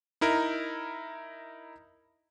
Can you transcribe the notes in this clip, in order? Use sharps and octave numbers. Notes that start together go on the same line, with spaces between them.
D#4 E4 A#4